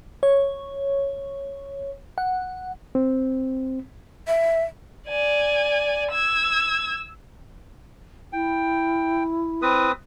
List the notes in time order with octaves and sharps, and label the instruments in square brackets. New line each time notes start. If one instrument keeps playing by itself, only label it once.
[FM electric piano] C#5
F#5
[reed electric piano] C4
[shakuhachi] E5
[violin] D5 G#5
E6 G#6
[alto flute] E4 [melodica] G5
[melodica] C4 B4 D#6